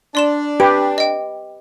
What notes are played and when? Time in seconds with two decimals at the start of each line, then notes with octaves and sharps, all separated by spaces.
0.15 D4 D5 C6 E7
0.60 G4 B4 D7
0.98 D#5 G5